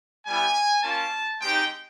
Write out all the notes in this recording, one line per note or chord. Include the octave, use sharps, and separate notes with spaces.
G3 B3 E4 G4 G#5
A#3 C#4 F4 A5
G#3 C4 D#4 G4 G5